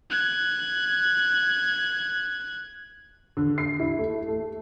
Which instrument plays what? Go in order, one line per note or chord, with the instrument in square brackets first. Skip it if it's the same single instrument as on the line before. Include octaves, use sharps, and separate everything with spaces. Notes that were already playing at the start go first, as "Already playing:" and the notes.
[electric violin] F#6 G#6
[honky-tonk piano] D3
C7
E4
A3
A3